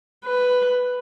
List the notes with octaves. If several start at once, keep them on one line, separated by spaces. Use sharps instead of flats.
B4